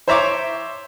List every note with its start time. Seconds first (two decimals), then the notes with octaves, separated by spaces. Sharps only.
0.08 C5 C#5 E5 A#5 C#6 D6